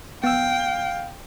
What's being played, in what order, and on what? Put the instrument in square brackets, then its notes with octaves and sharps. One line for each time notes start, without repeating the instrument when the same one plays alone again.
[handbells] B3 E6 [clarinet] F5 [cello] G5